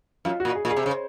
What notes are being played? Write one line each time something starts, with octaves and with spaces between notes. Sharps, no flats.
F#2 F4
F#4
A#2
G#4
A#2
G#4
C3
C#3 C5